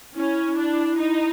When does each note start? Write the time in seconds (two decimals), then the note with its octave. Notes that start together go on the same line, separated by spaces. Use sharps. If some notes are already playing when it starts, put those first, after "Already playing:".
0.15 C#4 E4
0.57 D4
0.98 D#4